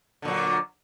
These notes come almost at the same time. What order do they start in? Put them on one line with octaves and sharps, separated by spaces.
D3 A#2 F#3